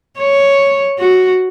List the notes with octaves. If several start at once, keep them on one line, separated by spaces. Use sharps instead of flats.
C#5
F#4